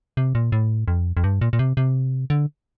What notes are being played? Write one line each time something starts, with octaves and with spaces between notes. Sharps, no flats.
C3
A#2
A2
F2
F2
G2
A#2
A#2
C3
C3
D3